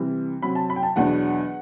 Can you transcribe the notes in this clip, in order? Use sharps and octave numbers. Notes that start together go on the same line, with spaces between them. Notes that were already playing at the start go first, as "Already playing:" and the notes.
Already playing: C3 E3 G3
C3 F#3 C4 B5
A5
B5
G5
A5
E2 B2 F#3 B3 D4 F#5